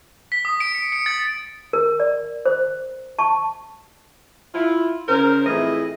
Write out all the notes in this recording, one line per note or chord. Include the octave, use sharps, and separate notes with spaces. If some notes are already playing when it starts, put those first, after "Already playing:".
B6
D#6
D7
C#7
C#7
A6
A#4
D5
C5
A5 C#6
E4 F4
C#3 A#4 C5
F2 A2 E3 E4 G#4 D#5